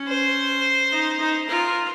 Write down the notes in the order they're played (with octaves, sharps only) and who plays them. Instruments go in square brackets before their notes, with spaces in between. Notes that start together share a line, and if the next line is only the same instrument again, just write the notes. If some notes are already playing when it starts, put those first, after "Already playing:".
Already playing: [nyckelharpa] C#4
[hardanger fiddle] C5
[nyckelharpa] D#4
D#4
[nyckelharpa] F4 [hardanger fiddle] A#4